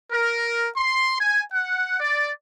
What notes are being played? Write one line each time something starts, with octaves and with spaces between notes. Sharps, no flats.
A#4
C6
G#5
F#5
D5